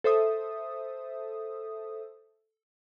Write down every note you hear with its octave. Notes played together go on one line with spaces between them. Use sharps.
A4 C5 E5 D#6